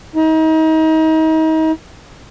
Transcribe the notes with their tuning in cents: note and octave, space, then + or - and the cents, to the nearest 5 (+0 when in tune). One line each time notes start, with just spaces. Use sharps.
D#4 +35